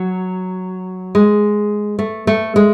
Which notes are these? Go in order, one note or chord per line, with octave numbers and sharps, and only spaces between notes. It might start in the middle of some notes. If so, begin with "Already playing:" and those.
Already playing: F#3
G#3
A3
A3
G#3